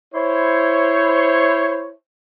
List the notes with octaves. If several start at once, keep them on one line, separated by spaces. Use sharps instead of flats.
E4 C5 C#5